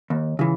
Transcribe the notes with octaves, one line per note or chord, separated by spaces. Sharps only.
D#2
C#3 E3